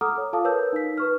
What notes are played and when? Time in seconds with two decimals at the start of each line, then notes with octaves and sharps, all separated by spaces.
0.01 A4 F#5 A#5 D6 D#6 F6
0.16 A4 C#5
0.33 F4 A4 F5 A5 D6 D#6
0.45 A#4 B4 C#5 E6 G6
0.73 D#4 B6
0.98 B4 C#6 F6